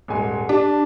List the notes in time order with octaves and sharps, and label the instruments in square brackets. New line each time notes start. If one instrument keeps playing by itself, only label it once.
[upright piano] D#1 G#2 G#5
[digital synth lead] D4 [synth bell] G4 [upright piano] D5